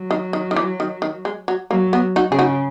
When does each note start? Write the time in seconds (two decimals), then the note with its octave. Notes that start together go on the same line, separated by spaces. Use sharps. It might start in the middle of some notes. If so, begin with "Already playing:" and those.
Already playing: F#3
0.11 D#3
0.33 D#3
0.51 D#3
0.56 E3
0.80 D#3
1.02 D#3
1.25 G#3
1.48 F#3
1.71 F#3 A#3
1.93 B3
2.16 D#4 F#4
2.32 C#3 G#4
2.39 D#4 F#4